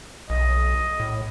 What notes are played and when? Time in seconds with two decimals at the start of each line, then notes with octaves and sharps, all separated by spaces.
0.30 B1 D#5
1.00 A2